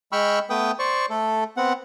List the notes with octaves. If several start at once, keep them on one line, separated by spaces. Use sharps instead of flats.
G#3 G5 B5 C#6 E6 F6
A3 B3 B4 G5 D#6
C5 D5 C#6
A3 A4
B3 C4 F#5